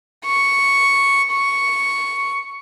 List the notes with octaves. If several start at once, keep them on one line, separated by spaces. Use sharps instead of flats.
C#6
C#6